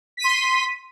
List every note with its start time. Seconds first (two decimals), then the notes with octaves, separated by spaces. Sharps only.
0.17 B6
0.21 D#7
0.24 C6